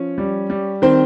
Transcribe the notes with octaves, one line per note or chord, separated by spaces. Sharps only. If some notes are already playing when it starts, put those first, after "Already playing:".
Already playing: F3 C#4
G3
G3
D#3 C4 C5